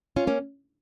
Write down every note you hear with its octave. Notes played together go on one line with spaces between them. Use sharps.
C#4 F4
A#3 C#4